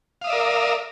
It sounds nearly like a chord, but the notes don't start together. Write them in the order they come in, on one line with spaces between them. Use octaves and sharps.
F5 D#6 E5 D5 A#4